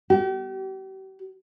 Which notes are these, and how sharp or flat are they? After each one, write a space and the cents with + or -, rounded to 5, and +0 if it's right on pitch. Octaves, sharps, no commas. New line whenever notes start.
G4 -40